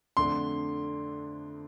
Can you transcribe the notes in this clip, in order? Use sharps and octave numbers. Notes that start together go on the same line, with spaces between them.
F2 D3 A3 D4 C6